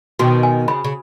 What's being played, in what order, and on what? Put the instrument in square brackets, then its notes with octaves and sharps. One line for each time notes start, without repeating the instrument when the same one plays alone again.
[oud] B2 D#3 [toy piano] F#4
[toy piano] G#5
[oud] C#3 [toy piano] B5
[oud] C#3